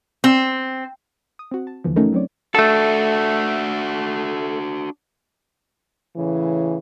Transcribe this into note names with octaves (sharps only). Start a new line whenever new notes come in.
C4
D#6
C4 F#4
A5
D#2 D3 E3 F3
A3 C#4 D#4 F#4 A4 A#4
F#3 C4 C#4 C#5 D5
A3 D4 F#4 A4
A2 C#3 E3